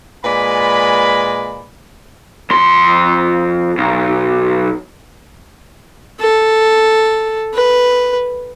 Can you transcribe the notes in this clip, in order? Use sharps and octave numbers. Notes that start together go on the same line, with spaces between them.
A#2 G#3 B4 D5 G#5 B5
F2 C6
B1
A4
B4